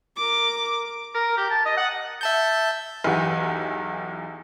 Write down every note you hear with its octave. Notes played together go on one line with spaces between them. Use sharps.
A#4 D6
A#4
G4
A5
D#5
F#5
E5 A5 G6
B1 E2 E3 G4 F#5 G#5